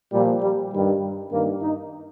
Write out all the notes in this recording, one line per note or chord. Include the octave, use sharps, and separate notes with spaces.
A#2 F3 G3
G3
G2 D#3 G3
G2 D#3 A#3
D#4